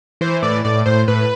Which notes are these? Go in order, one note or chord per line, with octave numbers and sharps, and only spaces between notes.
E3 C5
A2 D5
A2 D5
A2 C5
A2 B4